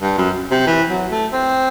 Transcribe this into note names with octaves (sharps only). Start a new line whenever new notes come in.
G2
F#2
C3
E3
F#3
A3
C4